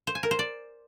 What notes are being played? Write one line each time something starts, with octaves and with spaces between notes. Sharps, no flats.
C5
G#5
A#4
C5
D5